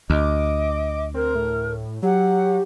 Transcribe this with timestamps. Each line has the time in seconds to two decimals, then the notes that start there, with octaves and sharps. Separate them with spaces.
0.10 D2 D#5 D6
1.14 C4 A#4
1.35 A2
2.03 F#3 G4 F#5